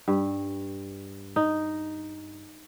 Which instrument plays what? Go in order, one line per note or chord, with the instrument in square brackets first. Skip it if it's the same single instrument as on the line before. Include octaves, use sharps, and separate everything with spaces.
[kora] G2
D#4